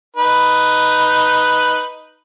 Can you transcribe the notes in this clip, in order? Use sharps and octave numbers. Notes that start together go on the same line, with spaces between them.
D#4 B4